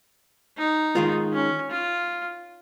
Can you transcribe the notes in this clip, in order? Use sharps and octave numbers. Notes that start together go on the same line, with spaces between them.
D#4
D#3 G#3 F4
C#4
F4